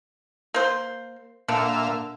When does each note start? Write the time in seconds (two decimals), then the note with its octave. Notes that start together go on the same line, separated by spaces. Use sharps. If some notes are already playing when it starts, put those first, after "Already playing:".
0.54 A#3 C5
1.49 A#2 D3 E5 F5